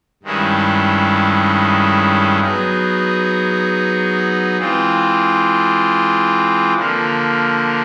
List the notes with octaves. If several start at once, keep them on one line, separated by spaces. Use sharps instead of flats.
G2 D#3 G#3 C#4 E4
F#3 B3 D#4 G#4
E3 G#3 C4 F4
D3 F3 A#3